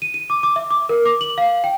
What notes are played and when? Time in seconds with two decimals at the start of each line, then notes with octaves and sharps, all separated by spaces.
0.02 D#7
0.14 D#7
0.30 D6
0.43 D6
0.56 E5
0.71 D6
0.89 A#4
1.05 D6
1.21 F#7
1.38 F5
1.64 G5